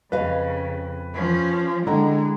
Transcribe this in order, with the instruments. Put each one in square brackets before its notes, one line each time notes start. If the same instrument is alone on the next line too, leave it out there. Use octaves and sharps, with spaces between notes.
[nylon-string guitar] F2 D#5 F5 [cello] C#3 [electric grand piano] B4
[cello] F3 C#4
[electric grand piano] D3 A#5 [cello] G#3 [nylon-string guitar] E4 D#5 G5